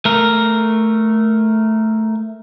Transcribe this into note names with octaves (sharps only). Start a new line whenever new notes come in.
A3 A#4